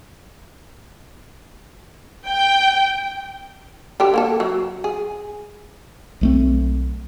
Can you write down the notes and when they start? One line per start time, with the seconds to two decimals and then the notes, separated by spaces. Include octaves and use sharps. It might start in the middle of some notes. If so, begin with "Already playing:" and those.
2.28 G5
4.00 D3 D4 G4
4.14 A#3 G4 A4
4.40 F#3
4.84 G#4
6.21 B1 A3 C4